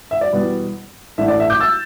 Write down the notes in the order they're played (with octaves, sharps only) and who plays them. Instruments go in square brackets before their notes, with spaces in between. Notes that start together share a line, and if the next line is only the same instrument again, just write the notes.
[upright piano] E5
D5
E2 B2 G3 B3
A1 A2 A3 D4 E5
D5
E5
D6 G6
E6 A6